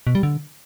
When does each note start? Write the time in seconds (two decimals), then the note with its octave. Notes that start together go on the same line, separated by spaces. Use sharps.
0.07 B2
0.15 G3
0.23 D3